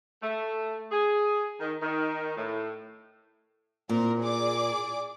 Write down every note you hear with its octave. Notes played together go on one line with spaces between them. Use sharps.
A3
G#4
D#3
D#3
A2
A#2 C4 A#4
G#4 D5 D6